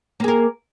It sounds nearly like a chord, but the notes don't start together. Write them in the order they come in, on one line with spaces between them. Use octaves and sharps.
A#3 G#4 A#4